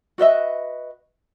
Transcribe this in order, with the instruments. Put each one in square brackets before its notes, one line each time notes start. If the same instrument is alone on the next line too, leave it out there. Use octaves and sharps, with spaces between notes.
[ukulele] F#4 B4 D#5 E5